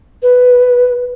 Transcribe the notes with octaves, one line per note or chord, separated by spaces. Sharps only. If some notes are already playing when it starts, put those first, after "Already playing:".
B4